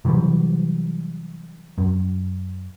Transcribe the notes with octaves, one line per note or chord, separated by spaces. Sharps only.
C3 E3 F#3 G3
F#2